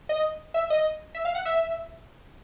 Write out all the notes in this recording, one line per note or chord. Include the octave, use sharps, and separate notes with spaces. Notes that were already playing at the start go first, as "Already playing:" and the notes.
D#5
E5
D#5
E5
F5
F#5
E5